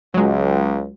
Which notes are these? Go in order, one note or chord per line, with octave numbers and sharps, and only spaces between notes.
C#2 F#3 G#3